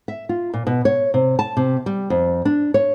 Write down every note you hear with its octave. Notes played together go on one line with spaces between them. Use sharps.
E5
F4
A#2
B2
C#5
C3
A5
C3
G3
F2
D4
C#5